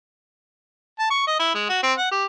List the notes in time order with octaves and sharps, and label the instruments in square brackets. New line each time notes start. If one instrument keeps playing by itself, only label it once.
[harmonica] A5
C#6
D#5
E4
G#3
F#4
C4
F#5
G4